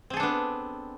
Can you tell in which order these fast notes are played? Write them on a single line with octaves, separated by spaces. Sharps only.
C4 G#4 A4 D4 B3